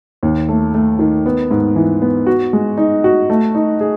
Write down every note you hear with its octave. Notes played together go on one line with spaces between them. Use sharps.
D#2
A3
A3
D#3
B3
G#2
E3
B3
F#4
G#3
D#4
F#4
A3
D#4
G#4